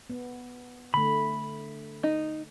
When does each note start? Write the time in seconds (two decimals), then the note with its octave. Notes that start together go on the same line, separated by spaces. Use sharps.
0.10 B3
0.94 D3 A3 B5
2.03 D#4